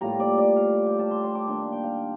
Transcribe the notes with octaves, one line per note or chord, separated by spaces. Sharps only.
A2 G3 A#3 F4 A#5
D5
D5
F5
G5
A5
C6
C6
D6
D#3 A#3 D4 C6
G5
F5